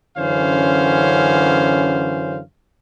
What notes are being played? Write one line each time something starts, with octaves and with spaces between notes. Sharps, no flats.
F#2 D3 E3 C#4 C5 F5